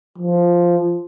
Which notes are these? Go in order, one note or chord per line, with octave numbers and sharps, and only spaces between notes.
F3